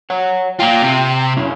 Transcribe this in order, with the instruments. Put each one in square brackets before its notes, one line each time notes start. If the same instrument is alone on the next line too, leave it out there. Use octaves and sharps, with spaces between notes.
[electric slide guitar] C#5 F#5
[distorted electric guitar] A#3 F4 [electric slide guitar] G5
[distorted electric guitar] C3
[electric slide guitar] F#2 C#4 E4